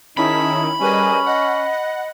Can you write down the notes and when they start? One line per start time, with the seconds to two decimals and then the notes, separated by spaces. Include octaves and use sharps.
0.17 D#3 C#4 D#4 E4 G#4 A5 B5
0.80 G3 C#4 G#4 A#4 B4 D#5 G#5
1.26 D#5 F#5
1.72 F#5